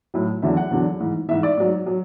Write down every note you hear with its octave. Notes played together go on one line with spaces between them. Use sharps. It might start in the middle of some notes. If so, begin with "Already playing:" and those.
A2 F#3
E2 D3 F#3 E5
F#5
E2 D3 F#3
G#2 E3
G#2 E3 E5
D5
G#2 F#3
F#3